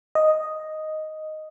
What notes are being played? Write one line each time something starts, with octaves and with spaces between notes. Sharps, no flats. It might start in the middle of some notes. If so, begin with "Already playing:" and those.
D#5